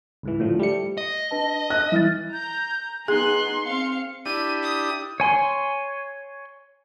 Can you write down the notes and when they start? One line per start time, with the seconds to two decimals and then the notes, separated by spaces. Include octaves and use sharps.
0.23 C#2 G#2 E3
0.40 A2 D3 F3
0.59 G3 A3 C#7
0.98 D#5
1.31 D4 B4 A5
1.70 F#6
1.92 E3 E5 F6 A6
2.33 A#5 G6
3.08 B3 D#4 G#4 G#5 C6 F#6
3.67 C4 F5 C#7
4.26 D4 E4 G4 D#7
4.63 D#6
5.20 C#5 G#5 C6